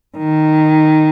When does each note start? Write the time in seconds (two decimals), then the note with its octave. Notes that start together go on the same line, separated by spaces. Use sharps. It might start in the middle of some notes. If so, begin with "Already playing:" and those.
0.17 D#3